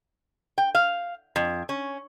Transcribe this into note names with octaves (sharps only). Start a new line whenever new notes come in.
G5
F5
F2
C#4